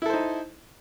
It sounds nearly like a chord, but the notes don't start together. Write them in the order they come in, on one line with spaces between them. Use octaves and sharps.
E4 A4 C5 D#4